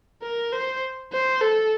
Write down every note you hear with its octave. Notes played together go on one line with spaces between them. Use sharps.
A#4
C5
C5
A4